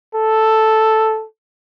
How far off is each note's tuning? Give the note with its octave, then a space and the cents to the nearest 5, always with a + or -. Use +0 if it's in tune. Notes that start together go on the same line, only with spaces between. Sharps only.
A4 +0